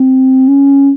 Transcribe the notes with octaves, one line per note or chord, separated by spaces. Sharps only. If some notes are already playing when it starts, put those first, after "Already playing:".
Already playing: C4
C#4